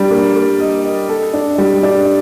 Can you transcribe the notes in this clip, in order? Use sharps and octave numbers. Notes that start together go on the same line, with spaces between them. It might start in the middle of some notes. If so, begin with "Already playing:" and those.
Already playing: G3 D4
A#3
A#3
D#5
D#5
A4
D4
G3
D4